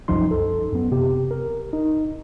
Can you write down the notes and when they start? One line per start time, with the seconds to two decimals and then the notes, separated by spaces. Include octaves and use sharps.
0.08 C2 F#2 F3 D#4 C6
0.31 A4
0.73 F#2 B3
0.92 C3 G4
1.31 A#4
1.73 D#4